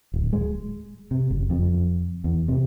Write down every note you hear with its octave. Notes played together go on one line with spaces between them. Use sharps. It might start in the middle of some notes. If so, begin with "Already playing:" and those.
D1
G#3
C3
F#1
F2
E2
C3